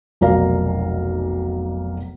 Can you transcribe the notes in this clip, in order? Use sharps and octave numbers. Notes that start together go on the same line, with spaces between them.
F1 B1 A#4 D5 F5 A#5